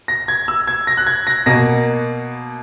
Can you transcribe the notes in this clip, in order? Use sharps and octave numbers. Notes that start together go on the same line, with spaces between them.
A#6
G#6
E6
G#6
A#6
F#6
G#6
A#6
B2 A#3 A#6